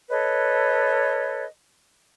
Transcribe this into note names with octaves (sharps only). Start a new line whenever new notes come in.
A4 B4 C#5 D#5